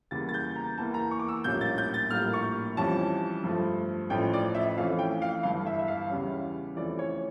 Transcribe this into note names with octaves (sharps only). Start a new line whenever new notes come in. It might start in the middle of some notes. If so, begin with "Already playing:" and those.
E2 C#3 G3 A#3 A6
A6
G6
A#5
E2 E3 A#3 A5
A#5
C#6
D6
E6
A#1 A2 G3 A#3 C#4 G6
A6
G6
A6
A#1 A2 G3 A#3 F6
C#6
F2 E3 G3 C#4 A5
G2 F3 A3
A1 A2 F3 A3 C#4 G5
D5
E5
F2 E3 A3 C#4 F5
G5
F5
G1 G2 E3 F5
E5
E5
F5
E2 C#3 G3 C#4
F2 E3 A3 C#4 D5
C#5